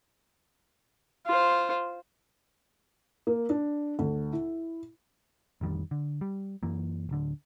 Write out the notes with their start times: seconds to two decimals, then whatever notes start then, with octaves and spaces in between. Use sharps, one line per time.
1.26 F4 C5
3.27 A#3
3.49 D4
3.99 D2
4.33 E4
5.61 A1 F2 D#3 G3
5.91 D3
6.21 G3
6.63 F#2 E3 A#3
7.09 D1 D3